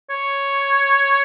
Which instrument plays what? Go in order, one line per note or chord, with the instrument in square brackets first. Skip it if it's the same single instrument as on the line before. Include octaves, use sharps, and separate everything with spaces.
[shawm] C#5